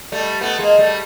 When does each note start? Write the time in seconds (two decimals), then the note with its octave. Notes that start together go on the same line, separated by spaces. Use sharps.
0.12 G3 A3
0.41 A3 B3
0.59 G#3 A#3
0.78 G3 A3